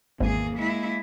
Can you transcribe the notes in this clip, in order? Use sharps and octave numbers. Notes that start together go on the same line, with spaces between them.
G#1 E2 A#3 G#4
G#3 E4